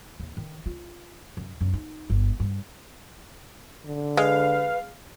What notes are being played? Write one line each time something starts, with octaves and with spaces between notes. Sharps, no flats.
D#2
D#3
F4
F#2
F#2
D#4
G1
G2
D3
G#3 B4 F5